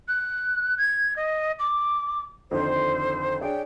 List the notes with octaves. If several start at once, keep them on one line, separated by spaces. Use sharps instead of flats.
F#6
G#6
D#5
D6
F2 D3 D#3 C5
D4 G#4 C#5 G5